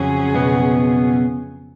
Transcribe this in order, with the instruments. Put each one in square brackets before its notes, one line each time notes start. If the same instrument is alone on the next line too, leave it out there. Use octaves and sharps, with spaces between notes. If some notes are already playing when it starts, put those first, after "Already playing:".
Already playing: [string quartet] F2 C#3 F#3 C#4 G#4
[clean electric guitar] B2 B3